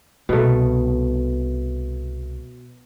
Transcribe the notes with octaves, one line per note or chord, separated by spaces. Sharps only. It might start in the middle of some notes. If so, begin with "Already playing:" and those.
C2 B2 A3